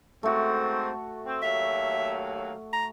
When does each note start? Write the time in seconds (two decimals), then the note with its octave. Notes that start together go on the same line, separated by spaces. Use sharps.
0.23 G#2 A3 C4 F#4
1.25 C4
1.42 D#2 F#3 E5 F5
2.73 A#5